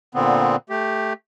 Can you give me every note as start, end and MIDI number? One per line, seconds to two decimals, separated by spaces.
0.15 0.56 46
0.15 0.56 50
0.15 0.56 59
0.15 0.56 60
0.70 1.13 57
0.70 1.13 67